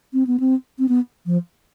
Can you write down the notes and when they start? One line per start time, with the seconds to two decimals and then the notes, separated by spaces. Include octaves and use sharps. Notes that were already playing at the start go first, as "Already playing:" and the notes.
0.13 C4
0.27 B3
0.40 C4
0.79 C4
0.89 B3
1.26 F3